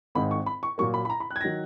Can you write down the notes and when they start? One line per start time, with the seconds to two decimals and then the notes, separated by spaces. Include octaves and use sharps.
0.15 G#1 G#2 D#3 G#3 B5
0.31 C#6
0.46 B5
0.63 C#6
0.78 A#2 F#3 A#3 C#6
0.94 B5
1.05 B5
1.10 A#5
1.20 B5
1.31 F#6
1.36 G#6
1.41 A#6
1.44 D#3 F#3